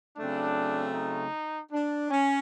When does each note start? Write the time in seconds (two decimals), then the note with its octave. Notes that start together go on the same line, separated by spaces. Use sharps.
0.17 C#3 F#3 A3 C4 D4
0.95 D#4
1.72 D4
2.10 C#4